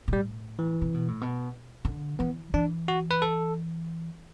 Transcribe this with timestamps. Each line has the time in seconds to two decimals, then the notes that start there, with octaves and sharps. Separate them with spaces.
0.08 B2
0.12 A2 G3
0.59 E3
0.82 C3
0.94 B2
1.08 A2
1.21 B2
1.85 D3
2.19 E3 B3
2.54 E3 D4
2.88 F#4
3.11 B4
3.22 A4